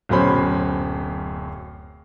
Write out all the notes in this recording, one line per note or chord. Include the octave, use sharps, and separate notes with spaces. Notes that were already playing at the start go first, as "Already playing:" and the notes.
D1 F#2 B2 C#4 C5 B5